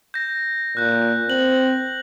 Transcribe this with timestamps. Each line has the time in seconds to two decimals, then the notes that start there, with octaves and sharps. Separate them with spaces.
0.14 G6 A#6
0.77 A#2 F#6 G6
1.30 C4 F#7